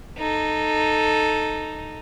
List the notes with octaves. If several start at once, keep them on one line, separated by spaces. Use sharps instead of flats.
D#4 A4